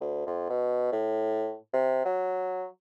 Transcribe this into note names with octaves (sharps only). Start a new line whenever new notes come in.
D2
F2
B2
A2
C3
F#3